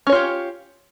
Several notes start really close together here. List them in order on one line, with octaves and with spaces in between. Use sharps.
C#4 C#5 F4 G4